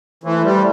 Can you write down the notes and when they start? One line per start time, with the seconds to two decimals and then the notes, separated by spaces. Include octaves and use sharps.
0.24 E3 A3 E4 C5
0.44 G3